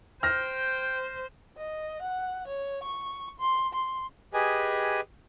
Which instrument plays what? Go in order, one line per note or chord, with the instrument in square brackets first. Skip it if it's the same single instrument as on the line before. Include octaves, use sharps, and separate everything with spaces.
[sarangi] C5 [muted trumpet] G5 [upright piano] F6 A#6
[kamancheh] D#5
F#5
C#5
C#6
C6
C6
[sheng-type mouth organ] G4 G#4 B4 D#5 G#5